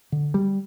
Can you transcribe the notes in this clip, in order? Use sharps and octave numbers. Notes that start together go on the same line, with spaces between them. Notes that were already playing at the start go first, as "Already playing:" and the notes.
D3
G3